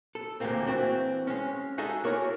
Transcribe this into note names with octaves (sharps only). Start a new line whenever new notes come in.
A4
D2 A#2 E3 G#3 A#3 C4
E3 C4 D4 F#4
G#3 C#4
D#4 F#4 G#4 A4 D#5 E5
E4 F#4 A#4 C#5 D5 G#5